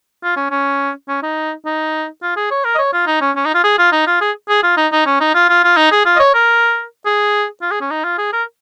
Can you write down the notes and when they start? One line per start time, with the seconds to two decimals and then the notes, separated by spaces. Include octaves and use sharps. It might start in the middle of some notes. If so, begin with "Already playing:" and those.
0.23 F4
0.36 C#4
0.51 C#4
1.08 C#4
1.22 D#4
1.65 D#4
2.22 F4
2.36 G#4
2.51 C#5
2.64 A#4
2.75 D#5
2.78 C#5
2.93 F4
3.06 D#4
3.21 C#4
3.36 C#4
3.46 D#4
3.54 F4
3.64 G#4
3.78 F4
3.92 D#4
4.07 F4
4.21 G#4
4.49 G#4
4.63 F4
4.77 D#4
4.92 D#4
5.06 C#4
5.20 D#4
5.35 F4
5.49 F4
5.64 F4
5.77 D#4
5.91 G#4
6.05 F4
6.16 D#5
6.19 C#5
6.34 A#4
7.06 G#4
7.62 F4
7.71 G#4
7.81 C#4
7.91 D#4
8.04 F4
8.18 G#4
8.33 A#4